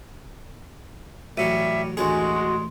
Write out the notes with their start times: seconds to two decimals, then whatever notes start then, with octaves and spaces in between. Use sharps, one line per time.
1.37 A1 F#3 G3 E5 C#7 D#7
1.97 A1 D2 G#3 D4 F#4 G#4 G#5 C6
2.36 C6